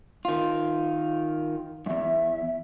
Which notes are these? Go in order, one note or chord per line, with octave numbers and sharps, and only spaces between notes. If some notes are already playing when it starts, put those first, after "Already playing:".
D#3 F4
E2 G2 E5